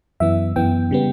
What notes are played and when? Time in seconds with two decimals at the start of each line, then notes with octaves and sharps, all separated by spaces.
0.20 F#2 E3 B3 E5
0.56 F#2 E3 B3 G5
0.91 C#3 G3 B3